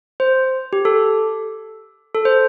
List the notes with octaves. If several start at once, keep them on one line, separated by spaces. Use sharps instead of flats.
C5
G4
A4
A4
C5